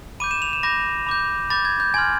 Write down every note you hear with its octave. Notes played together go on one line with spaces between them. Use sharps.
B5 D6 G6 D#7
E7
F7
E7
B5 D6 G6 A#6
B5 D6 G6
B5 D6 G6 A6
G#6
G6
G#5 C6 F6 G#6